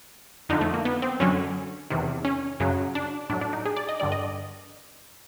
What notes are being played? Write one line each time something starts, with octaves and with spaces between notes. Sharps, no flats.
F2 D3 F3 D#4
A3
A#3
B3
C4
F#2 D3 F#3 C#4
E2 C3 D#3
C#4
F#2 C#3 F#3
D4
A2 F#3 D4
D4
D#4
G#4
D5
D#5
G2 D3 G3 D5
D#5